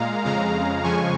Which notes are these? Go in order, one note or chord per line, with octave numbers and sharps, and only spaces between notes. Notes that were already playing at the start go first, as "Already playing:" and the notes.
Already playing: A#2 G#3 F5 A#5
F2 C#3 G#3 F5 A#5
F2 C#3 F3 G#3 G#5 C#6